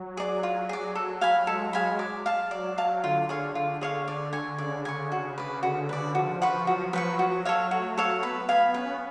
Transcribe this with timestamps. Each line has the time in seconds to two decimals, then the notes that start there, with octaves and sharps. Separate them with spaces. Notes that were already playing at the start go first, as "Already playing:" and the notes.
Already playing: F#3
0.17 G#4 D5
0.43 F4
0.69 G#4 D5
0.95 A4
1.21 F5 G#5 B5
1.47 G#3 A4
1.73 F5 G#5 B5
1.99 D5
2.26 F5 A5
2.51 F#3 D5
2.78 F5 A5
3.04 D3 F4
3.29 G#4 C#5 F5
3.54 D3 F4
3.81 G#4 C#5 F5
4.07 D3 D5
4.33 G#5 C#6
4.58 C#3 D5
4.85 G#5 C#6
5.12 F#4
5.38 B4 D5
5.63 D3 F#4
5.89 B4 D5
6.15 F3 F#4
6.42 B4 F#5 C#6
6.67 F#3 F#4
6.93 B4 F#5 C#6
7.19 F#4
7.45 A4 C#5 F5
7.71 A3 F#4
7.98 A4 C#5 F5
8.23 B3 B4
8.49 F5 G#5 B5
8.74 C#4 B4